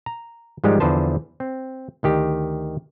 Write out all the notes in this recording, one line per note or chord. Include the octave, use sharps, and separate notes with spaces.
A#5
G#2 D#3 F3 G3 G#3 G4
E2 D3 F3 B4 C5 A5
C4
D2 D#3 G4